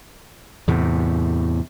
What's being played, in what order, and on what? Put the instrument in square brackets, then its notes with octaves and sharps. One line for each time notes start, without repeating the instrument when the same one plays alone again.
[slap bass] E2 A2 C3